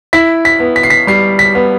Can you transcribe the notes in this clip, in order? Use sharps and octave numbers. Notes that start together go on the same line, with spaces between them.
E4 B6
B6
B3
B6
C7
B6
G3 C7
B6
B3